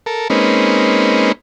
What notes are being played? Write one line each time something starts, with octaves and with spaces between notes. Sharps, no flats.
A4 A#4
G#3 A#3 C4 C#4 D#4 B4